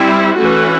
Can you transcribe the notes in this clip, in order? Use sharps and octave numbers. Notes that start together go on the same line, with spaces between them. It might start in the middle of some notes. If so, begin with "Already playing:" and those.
Already playing: G3 C4 E4
E3 A3 C#4 F#4 B4